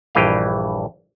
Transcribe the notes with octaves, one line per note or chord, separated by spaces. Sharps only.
A#1 G2 E3 G4 D#5 F5